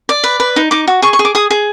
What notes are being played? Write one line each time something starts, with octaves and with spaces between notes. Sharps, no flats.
D5
B4
B4
D#4
D#4 D6
F#4
G#4 C#6
C#6
G#4
D6
G#4 D#6
G#4